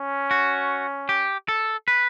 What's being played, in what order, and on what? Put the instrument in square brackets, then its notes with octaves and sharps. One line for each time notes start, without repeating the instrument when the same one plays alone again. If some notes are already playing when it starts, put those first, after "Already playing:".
Already playing: [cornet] C#4
[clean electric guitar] F#4
G4
A4
B4